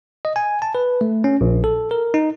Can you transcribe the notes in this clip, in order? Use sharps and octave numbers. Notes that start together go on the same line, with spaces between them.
D#5
G#5
A5
B4
A3
C#4
A#1
A4
A#4
D#4